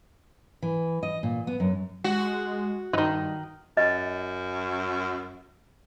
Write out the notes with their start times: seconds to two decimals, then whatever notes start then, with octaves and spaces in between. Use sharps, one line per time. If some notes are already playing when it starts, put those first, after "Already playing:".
0.62 E3
1.03 D#5
1.23 A#2
1.47 B3
1.60 F#2
2.04 G#3 F#4
2.93 G2 D#3 E3 D#4
3.77 F#2 D#5